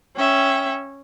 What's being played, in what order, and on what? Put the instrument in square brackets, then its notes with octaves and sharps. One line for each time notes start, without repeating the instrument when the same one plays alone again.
[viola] C#4 [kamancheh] E5 G5